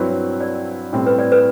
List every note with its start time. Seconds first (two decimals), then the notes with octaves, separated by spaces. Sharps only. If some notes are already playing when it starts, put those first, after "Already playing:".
Already playing: G2 F#3 C4 E4 B4
0.41 D5
0.93 A2 G3 C4
1.06 B4
1.19 D5
1.32 B4